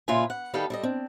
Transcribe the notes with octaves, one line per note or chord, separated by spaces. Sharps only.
A#2 C#3 F4 B4 E5 G#5
F#5
D#3 G3 B3 A4 F5 G5
G3 A4 D#5
C4 D4